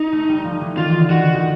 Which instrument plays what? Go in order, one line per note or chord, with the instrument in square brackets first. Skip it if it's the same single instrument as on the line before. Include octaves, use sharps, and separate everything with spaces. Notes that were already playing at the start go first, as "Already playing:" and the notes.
Already playing: [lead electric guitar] D#4
[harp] A3
G3
F3
E3
[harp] D#3 [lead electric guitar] F4
[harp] D3
[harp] D#3 [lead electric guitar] F#4
[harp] D#3